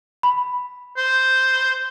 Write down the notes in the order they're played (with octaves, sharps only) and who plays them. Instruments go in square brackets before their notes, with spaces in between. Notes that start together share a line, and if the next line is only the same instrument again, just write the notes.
[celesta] B5
[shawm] C5